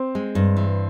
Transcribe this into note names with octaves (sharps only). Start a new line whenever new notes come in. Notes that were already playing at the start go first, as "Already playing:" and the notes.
Already playing: C4
G#3
G2
E3